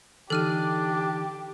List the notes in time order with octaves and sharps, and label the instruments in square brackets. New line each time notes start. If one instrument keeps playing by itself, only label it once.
[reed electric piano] D3 E3 D#4 [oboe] D4 [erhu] G4 [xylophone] A4 F6 D#7